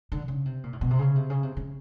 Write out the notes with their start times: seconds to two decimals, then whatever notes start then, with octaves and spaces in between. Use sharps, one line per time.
0.12 D3
0.28 C#3
0.45 C3
0.63 A#2
0.73 A2
0.81 B2
0.90 C3
0.99 C#3
1.16 C3
1.30 C#3
1.43 C3
1.57 C#3